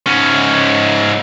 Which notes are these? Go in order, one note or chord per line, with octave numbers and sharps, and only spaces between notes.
G#2 C#4